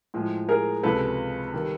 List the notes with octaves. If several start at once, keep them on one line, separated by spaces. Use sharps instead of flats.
A2 F3 G#3
G#4 A#4
C#2 C3 F3 G#3 A4 B4
D#3 G3